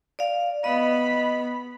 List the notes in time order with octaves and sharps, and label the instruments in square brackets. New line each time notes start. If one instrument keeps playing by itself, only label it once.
[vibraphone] D5 F5
[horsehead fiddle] B3 B5 [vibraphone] D#5